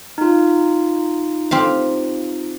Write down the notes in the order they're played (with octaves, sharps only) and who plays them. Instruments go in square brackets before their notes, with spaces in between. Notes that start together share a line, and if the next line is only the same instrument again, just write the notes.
[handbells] D#4 F4
[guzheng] C4 G4 F5